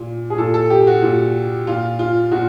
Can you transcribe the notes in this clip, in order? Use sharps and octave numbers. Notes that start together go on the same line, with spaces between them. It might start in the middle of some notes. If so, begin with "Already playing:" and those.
Already playing: A#2
G#4
A#2 A4
A4
G4
F#4
A#2
A#2 F4
F4
A#2 F#4